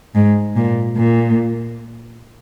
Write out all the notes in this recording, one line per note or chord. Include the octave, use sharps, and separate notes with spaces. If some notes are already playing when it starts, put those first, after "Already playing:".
G#2
A#2
A#2